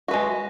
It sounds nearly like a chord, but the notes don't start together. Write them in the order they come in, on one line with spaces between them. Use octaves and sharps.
F#4 B4 G#3